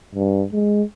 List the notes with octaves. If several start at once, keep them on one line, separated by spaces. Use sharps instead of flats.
G2
G#3